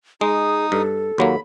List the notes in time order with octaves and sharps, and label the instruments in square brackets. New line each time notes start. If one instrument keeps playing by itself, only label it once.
[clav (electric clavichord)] G#3 [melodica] D#4 D#6 [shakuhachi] G#4
[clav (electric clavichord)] G2 [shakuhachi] A4
[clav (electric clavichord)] D#2 F#3 A#3 [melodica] B5